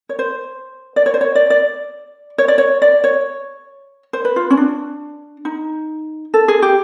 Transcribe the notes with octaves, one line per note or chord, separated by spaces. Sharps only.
C#5
C5
D5
C#5
C5
C#5
D5
D5
C#5
D5
C#5
D5
C#5
C5
B4
F4
C#4
D4
D#4
A4
G#4
G4